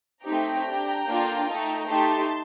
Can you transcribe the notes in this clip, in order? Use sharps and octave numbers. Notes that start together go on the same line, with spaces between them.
A3 C4 D#4 G4 G5 A#5
D4 G4
A#3 D4 F4 A4
A3 D#4 A4
A3 D#4 G4 A5 C6